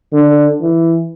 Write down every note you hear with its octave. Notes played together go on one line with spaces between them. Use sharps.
D3
E3